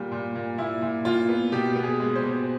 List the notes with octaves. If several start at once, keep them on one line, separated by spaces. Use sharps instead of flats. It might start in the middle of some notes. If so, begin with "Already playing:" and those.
Already playing: A#2 G3
A#2
A#2
A#2 E4
A#2
A#2 F4
B3
B2 G4
B3
G#4
G#3
C5
B2